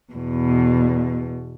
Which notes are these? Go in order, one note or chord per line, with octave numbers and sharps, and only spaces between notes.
E2 B2